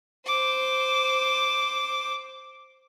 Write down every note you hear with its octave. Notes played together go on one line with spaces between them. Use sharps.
C5 D6